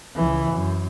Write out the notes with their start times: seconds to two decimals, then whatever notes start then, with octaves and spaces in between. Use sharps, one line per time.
0.15 C#2 E3
0.50 F#2